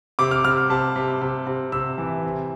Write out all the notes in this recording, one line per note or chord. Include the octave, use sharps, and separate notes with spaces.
C3 D6
F6
C3 F6
C3 A5
C3
C3
C3
C3 E6
E3
C3